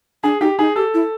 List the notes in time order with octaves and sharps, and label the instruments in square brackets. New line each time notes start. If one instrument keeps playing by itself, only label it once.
[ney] D4 [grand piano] G#4
[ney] D#4 [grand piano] G4
[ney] D#4 [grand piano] G#4
[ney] G4 [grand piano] A4
[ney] E4